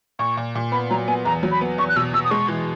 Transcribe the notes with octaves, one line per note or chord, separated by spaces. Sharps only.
A#2 C#6
A#2
A#2
B3 B5
F#3 A#5
B3 G#5
E2 A#5
F#3
B5
B3
E2 C#6
F#6
B2 E6
B2 E6
D#6
G#3 C#6
E3